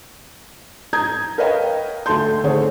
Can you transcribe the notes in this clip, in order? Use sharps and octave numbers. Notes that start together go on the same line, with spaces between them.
A#5 D#6 G6 G#6
A#4 B4 C#5 D#5 F5 G5
D2 A3 A5 C6 G6
D3 D#3 A3 C4 G#4 C#5